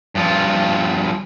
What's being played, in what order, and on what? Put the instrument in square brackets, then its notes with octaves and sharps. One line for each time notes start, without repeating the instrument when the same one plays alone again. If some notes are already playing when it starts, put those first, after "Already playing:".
[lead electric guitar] G2 F3